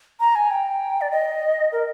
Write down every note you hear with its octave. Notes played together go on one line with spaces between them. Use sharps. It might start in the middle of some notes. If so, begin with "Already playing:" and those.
A#5
G#5
G5
D5
D#5
A#4